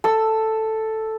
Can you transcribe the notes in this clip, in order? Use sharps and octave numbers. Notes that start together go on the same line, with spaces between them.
A4 E6